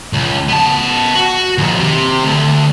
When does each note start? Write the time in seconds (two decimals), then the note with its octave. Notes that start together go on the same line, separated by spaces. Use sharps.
0.13 C#2
0.48 B3 A5
1.15 F#4
1.58 D#2 F3
1.79 C3
2.25 D2